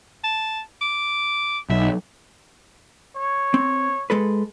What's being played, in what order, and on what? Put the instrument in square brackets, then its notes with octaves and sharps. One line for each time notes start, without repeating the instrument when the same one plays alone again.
[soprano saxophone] A5
D6
[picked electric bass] B1 [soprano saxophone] E5
[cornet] C#5
[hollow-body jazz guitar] C4
G#3 A4 B4